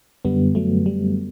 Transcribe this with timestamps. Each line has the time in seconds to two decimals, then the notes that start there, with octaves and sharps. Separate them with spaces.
0.25 F#2 D3 G3 B3
0.55 F#3 A3
0.86 G3